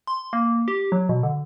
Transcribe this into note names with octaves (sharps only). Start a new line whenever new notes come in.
C6
A#3
G4
F#3
B2
D3